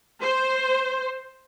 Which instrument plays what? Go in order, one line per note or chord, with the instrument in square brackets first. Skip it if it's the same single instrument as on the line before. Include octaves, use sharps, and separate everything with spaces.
[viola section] C5